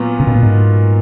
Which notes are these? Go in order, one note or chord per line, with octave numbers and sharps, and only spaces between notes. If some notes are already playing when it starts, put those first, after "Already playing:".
Already playing: A#2 F#3 B3 F4
C#3
B2
A#2
G#2